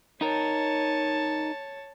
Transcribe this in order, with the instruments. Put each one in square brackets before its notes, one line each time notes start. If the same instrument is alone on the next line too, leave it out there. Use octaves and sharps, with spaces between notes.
[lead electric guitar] D#4 A#4 [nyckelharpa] C#5 A5